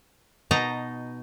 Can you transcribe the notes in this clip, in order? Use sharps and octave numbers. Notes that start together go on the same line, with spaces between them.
B2 D#4 A5 A#5